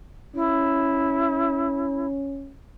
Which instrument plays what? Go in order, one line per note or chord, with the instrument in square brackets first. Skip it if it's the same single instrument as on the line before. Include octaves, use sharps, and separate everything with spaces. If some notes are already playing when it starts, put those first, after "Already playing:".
[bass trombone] C#4 [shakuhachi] E4